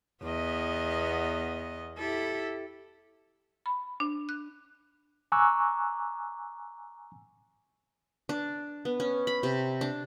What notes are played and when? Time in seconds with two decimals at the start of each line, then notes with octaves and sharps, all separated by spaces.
0.23 E2 B3 D#5
1.98 E4 G4 A4
3.66 B5
4.00 D4
4.29 F#6
5.32 G#5 A#5 C#6 D6 E6 F#6
8.29 D4
8.85 B3
9.00 C#4
9.27 B5
9.43 C3
9.81 D4